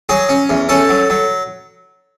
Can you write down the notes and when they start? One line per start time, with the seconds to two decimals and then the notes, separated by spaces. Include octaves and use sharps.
0.09 F#3 G#4
0.29 C#4
0.50 E2
0.69 C#4 A4
0.89 F#3
1.10 F#3